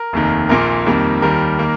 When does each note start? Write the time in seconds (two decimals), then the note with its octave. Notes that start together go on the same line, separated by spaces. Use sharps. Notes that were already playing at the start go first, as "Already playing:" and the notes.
Already playing: A#4
0.13 F1 D#2 D#3
0.49 A#1 A#2 A#3 A#4
0.86 F2 D#3 G3 A#3
1.22 D#2 D#3 G3 A#4
1.59 D#3 A#3